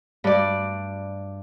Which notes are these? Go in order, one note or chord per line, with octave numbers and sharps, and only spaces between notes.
G2 D5